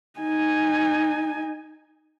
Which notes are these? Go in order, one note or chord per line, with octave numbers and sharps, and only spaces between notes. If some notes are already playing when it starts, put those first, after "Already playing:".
D#4 G#5